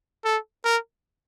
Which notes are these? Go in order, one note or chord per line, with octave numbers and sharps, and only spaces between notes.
A4
A#4